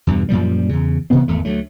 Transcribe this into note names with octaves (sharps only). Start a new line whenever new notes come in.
E2 G2 B2
F#2 A#2 F3 G3
E2 C#3
C3 E3 B3 C4
G#1 E2 A3
D2 F#3 A3